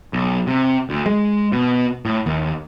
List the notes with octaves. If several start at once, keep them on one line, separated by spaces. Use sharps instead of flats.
B1
C3
D2
G#3
B2
A2
D#2